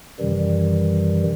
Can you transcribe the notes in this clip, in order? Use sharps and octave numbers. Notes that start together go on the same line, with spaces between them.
F#2 C3 D#3 E3 G3